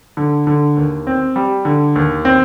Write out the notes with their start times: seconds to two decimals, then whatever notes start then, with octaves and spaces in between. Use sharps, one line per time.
0.17 D3
0.47 D3
0.77 D#2
1.07 C4
1.36 G3
1.65 D3
1.96 D#2
2.25 C4